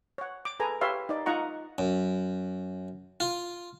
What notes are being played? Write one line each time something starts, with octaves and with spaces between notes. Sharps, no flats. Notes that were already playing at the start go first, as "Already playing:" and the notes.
C#5 F#5
D6
G#4 A4 B4 G#5 A#5
G4 B4 C#5 E5 F5 C6
D#4 D5
D#4 F4 D#5 F#5 A#5 C#6
F#2
F4